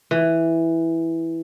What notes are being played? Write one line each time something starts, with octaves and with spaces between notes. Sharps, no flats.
E3